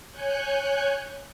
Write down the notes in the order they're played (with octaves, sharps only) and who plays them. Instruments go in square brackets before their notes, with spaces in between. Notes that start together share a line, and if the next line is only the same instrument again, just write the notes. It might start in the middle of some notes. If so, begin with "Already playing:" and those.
[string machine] C#5 G#5 C#6 F#6 G6